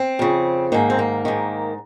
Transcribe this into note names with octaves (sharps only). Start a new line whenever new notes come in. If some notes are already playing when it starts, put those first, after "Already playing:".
Already playing: C4
F2 C#3
G#2 D#3 A#3
C4
A#3
G#2 D#3